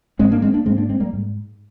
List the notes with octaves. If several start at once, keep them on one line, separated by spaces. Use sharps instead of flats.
G#2 G#3 C4
A#3 D4
G#3 C4
A#3 D4
G#2 G#3 C4
A#3 D4
G#3 C4
G3 A#3
G#2